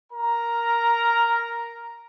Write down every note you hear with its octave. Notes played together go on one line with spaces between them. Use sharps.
A#4 A#5